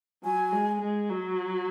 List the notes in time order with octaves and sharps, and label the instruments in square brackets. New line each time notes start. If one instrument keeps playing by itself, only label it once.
[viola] F#3 [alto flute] G#5
[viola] G#3
G#3
F#3